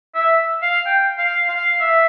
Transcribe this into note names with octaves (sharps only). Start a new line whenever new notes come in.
E5
F5
G5
F5
F5
E5